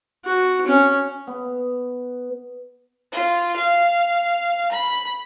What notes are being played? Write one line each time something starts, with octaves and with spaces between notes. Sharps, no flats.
F#4
C#4
B3
F4
F5
B5